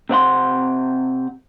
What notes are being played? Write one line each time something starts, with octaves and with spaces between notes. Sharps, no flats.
C3 C4 F#5 C6